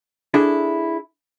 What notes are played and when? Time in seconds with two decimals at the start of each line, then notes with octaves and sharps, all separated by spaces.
0.34 D4 E4 G#4 A4